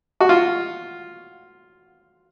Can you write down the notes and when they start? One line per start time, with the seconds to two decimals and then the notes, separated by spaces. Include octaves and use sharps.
0.21 F#4
0.29 F4